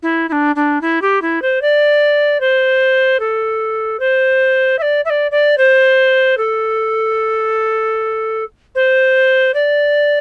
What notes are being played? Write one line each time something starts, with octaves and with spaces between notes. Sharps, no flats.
E4
E4
D4
D4
E4
G4
E4
C5
D5
C5
A4
C5
E5
D5
E5
D5
D5
C5
A4
C5
D5